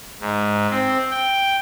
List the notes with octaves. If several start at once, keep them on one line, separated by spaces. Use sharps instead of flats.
G#2
C4
G5